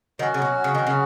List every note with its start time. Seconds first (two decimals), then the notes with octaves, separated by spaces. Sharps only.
0.19 D#3 F#3 C#4 F#4
0.34 C#3
0.42 B2
0.64 C#3
0.75 D#3
0.87 C#3